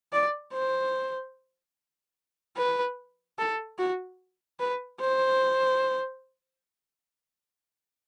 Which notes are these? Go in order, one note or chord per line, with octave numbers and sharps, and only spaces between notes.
D5
C5
B4
A4
F#4
B4
C5